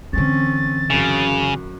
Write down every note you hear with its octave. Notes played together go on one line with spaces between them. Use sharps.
D3 E3 C4 C#4 A6
F#2 C#3